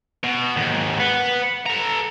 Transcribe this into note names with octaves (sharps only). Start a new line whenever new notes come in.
B2
D#2 G#2
B4 F#5
A4 A#5